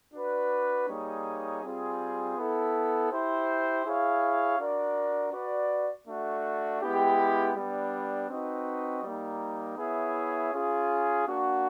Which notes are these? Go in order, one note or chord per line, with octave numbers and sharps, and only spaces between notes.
D4 F#4 B4 D5
G3 A#3 D#4 G#4 C#5
G3 C4 F4 G#4
B3 E4 A4
E4 G4 C5
E4 G#4 C#5 F5
D4 F#4 A#4 D5
F#4 B4 D5
A3 D4 F#4
G#3 B3 E4 G4
G3 B3 D4
C4 D#4 F#4 B4 D#5
G3 A#3 D#4
B3 E4 G#4 C#5 E5
C#4 F4 G#4
A#3 D4 F#4